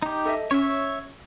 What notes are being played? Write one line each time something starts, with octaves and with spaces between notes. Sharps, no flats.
D#4 G4
A4 D#5 E5
C#4 C#5 E5